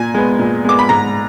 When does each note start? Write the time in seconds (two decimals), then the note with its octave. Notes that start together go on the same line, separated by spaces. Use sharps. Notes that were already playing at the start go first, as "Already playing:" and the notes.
Already playing: A#2 G#5
0.14 G#3 B3
0.39 A#2
0.65 G#3 B3 D6
0.79 B5
0.89 G#2 A#5